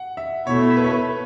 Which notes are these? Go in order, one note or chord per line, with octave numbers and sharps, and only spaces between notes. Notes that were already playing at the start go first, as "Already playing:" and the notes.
Already playing: F#5
E5
B2 A3 E4 C#5
B4
C#5
B4